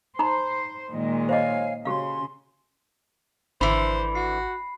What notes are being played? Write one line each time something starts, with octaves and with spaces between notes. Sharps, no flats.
D#4 C5 A#5 B5
A#2 D#3 G#3
C5 C#5 D#5 F5 G#5
C#3 F#4 G4 F5 C6
G#1 D3 E3 C5 B5
F#4 C7